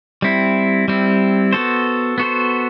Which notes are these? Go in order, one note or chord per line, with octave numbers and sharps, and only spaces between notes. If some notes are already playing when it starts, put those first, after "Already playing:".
G3 C4 E4
G3 C4 E4
B3 F#4 A4 C5
B3 F#4 A4 C5